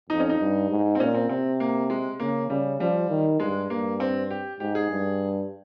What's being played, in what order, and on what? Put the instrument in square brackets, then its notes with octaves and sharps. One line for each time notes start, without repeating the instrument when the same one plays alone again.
[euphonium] F2 [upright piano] D#4
[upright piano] C#4
D#4
[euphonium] G2
G#2
[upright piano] C4
[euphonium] A#2 [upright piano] C#4
[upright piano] C4
[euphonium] C3 [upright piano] C4
[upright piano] A#3
G#3
[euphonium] C#3 [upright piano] A#3
[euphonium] C#3 [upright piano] G3
[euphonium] F3 [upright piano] G3
[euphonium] D#3
[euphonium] G2 [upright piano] G#3
[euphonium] G2 [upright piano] A#3
[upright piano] C4
G4
[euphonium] G#2 [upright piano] G4
[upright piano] G#4
[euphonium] G2